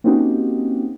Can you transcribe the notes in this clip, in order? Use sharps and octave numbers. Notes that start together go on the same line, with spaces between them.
A#3 C4 C#4 D#4 F#4 G4